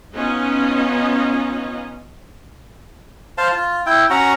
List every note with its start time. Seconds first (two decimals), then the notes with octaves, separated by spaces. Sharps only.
0.14 B3 C#4 D#4 F4 D#5
3.38 C5 F5 A5
3.52 F4
3.86 E4 G5
4.10 C#4 F#4 F#5 A#5